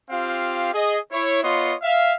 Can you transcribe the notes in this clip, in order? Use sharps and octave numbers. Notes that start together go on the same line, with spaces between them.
C4 F4 G4 F5
G#4 D#5
E4 C#5
B3 F4 C#5 D#5 C6
E5 F5